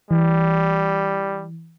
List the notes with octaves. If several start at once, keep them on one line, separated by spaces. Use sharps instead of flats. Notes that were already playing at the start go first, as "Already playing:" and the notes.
E3 G3